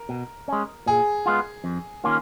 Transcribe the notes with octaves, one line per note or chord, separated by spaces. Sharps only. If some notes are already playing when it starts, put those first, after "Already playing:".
Already playing: A#4
B2
G#3 C#4
A#2 G#4
G#3 B3 F4
F2
D#3 A#3 C#4 F4